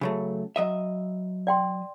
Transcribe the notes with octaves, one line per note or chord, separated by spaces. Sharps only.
C#3 F#3 A3
F#3 D#5 E5
D5 G5 C6